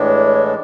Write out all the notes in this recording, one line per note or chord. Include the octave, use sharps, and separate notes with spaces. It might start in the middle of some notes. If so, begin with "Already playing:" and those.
Already playing: A2 E3 G#3 D4 C#5